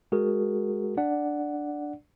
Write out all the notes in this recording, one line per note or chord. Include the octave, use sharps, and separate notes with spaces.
G#3 F#4 G#4 A#4
D4 D5 F#5